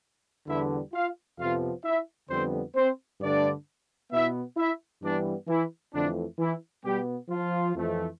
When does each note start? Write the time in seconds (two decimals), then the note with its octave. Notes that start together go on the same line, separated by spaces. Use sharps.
0.47 E2 D3 G3 B3 E4 E5
0.93 F4 F5
1.38 F2 C3 F3 B3 F4 F5
1.84 E4 E5
2.30 F2 D3 G3 B3 C4 C5
2.75 C4 C5
3.21 G2 D3 A3 D4 D5
4.11 B2 B3 E4 E5
4.57 E4 E5
5.02 G2 E3 G3 B3 D4 D5
5.47 E3 E4
5.93 F2 D3 E3 A3 D4
6.38 E3 E4
6.84 B2 G3 B3 G4
7.29 F3 F4
7.75 F2 E3 A3